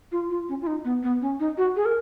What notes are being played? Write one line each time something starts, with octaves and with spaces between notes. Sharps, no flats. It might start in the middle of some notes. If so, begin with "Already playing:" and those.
F4
F4
C#4
F4
D#4
B3
B3
C#4
D#4
F#4
G#4
A#4